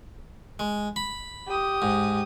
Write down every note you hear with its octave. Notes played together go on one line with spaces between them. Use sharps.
G#3
B5
G4 D#6
G#2